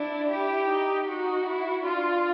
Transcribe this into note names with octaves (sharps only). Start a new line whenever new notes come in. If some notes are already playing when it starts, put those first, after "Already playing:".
Already playing: D4 E4
E4 G4
D#4
D#4 F#4
E4
D4 F4